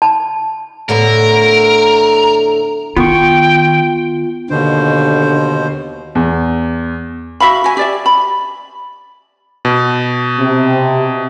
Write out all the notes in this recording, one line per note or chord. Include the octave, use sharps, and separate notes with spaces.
A5
A2 D3 B3 A#4
D#3 B3 F4 G5 C#6
D#2 B2 D3 C5
E2
F#4 E5 F5 B5
F#4 G#5
G4 D5 E5
B5
B2
C3